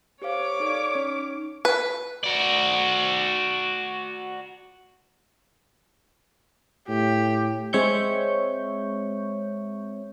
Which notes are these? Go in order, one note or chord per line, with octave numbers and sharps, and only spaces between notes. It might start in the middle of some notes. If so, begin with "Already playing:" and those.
G4 C5 C#5 F5 D6
D#4 A4 D5
C#4 D#4
B4
F#4 D5
A2 G4
G#3 C4 C#5 E5 C#6 G6